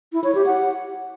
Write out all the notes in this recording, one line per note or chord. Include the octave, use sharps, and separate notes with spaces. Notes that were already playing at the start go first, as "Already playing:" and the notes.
E4
C#5
G4
F#5